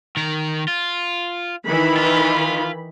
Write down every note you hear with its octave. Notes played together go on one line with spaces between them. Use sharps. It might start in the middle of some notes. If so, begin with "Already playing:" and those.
D#3 A#4
F4
D#3 E3 B5
F4